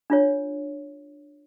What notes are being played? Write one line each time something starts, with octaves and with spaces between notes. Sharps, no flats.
D4 F4 C#5